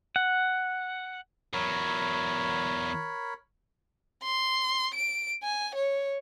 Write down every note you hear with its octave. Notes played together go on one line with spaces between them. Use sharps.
F#5
E2 F#3 A#4 C#5 B5
C6
D7
G#5
C#5